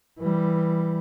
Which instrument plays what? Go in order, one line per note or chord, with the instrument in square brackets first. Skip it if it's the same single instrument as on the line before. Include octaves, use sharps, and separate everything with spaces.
[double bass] E3 G3